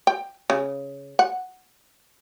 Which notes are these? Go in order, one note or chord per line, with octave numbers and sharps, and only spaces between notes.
G5
C#3
F#5